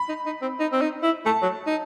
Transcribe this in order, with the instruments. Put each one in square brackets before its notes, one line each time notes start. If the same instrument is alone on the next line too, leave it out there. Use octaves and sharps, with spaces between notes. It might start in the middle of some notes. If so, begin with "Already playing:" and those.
Already playing: [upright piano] B5
[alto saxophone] D#4
D#4
C4
D#4
C4
D#4
E4
[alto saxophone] A3 [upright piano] A5
[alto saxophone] F#3
D#4